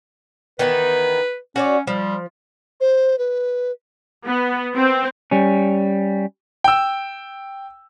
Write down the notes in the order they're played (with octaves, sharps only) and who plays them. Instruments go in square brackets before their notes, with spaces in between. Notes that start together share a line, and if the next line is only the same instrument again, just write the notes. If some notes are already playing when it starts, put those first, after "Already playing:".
[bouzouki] D#3 E3 B3 [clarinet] B4
[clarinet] C#4 [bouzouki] F#4 C#5 D5
[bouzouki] F3 [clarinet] G3
[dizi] C5
B4
[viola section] B3
C4
[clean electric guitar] G3 C#4
[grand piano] G5 E6